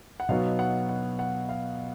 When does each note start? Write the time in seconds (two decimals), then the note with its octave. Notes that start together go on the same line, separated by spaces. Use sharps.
0.20 F#5
0.29 B2 F#3 B3 D#4 F5
0.59 F#5
0.89 F#5
1.19 F#5
1.49 F5